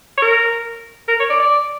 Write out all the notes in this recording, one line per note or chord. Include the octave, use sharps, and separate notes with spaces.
C#5
A#4
A#4
C#5
D5
D5